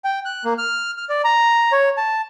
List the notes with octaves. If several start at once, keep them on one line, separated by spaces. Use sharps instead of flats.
G5
F#6
A#3
F6
F6
D5
A#5
C#5
A5